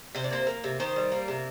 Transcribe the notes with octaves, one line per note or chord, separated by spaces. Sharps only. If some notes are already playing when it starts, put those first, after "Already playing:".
C3 C5
D5
A#3 C5
A#3
C3
D#3 C5
G3
A#3
C3